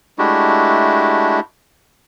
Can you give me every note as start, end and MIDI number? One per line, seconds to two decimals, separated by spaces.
0.19 1.40 56
0.19 1.40 57
0.19 1.40 62
0.19 1.40 64
0.19 1.40 66
0.19 1.40 67